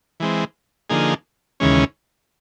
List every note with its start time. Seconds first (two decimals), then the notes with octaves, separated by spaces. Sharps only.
0.20 E3 G#3 C4
0.90 D3 F3 A#3 D#4 G#4
1.60 D#2 C#3 E3 G#3 C#4